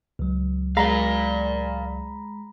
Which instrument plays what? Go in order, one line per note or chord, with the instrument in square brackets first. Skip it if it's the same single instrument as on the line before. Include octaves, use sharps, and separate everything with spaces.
[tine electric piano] C#2 F#3
[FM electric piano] G#3 A#5 B5 [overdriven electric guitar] D5 F5